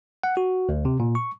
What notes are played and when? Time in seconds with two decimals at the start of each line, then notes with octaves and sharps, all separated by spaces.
0.23 F#5
0.37 F#4
0.69 D2
0.85 C3
1.00 A#2
1.15 C#6